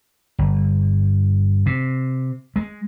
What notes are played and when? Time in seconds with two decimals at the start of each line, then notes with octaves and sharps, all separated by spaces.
0.39 G1
1.66 C3
2.56 G#3